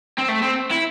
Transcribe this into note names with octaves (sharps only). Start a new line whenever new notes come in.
C4
A3
C4
E4